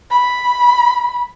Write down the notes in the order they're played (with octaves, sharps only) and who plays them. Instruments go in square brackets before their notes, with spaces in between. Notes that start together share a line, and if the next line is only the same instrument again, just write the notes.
[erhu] B5